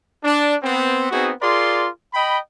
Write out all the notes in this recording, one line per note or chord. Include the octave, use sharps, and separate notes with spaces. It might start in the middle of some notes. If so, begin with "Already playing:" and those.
D4
B3 C4
B3 C4 D#4 F#4 G#4
F4 G#4 A#4 D5 C6
D#5 G5 B5